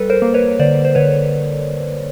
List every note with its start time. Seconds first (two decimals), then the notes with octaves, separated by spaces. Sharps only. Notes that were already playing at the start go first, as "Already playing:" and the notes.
Already playing: G3 A4 B4
0.10 A#4 C5
0.22 A#3
0.34 B4 C#5
0.59 D3 C5 D5
0.85 C5
0.95 D3 B4 C#5